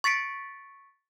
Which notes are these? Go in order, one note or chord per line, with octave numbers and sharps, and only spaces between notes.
C#6 A6 B6 C#7 D7